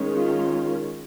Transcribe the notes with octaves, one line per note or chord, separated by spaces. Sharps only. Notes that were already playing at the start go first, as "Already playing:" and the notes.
Already playing: D#3 G#3 C#4
F4